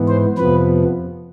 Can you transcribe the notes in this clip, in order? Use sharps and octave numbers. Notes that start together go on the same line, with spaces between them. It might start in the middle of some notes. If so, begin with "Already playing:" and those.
Already playing: G#2 E3 B3
C5
F2 C3 F3 B3 B4